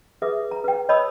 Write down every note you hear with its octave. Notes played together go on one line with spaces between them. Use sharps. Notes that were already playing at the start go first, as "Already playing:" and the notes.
G#4 B4 E5 D#6
A#5
B4 G5
C#5 D#5 A5 B5 D#6 E6